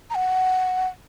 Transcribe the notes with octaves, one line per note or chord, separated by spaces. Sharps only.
A#5
F#5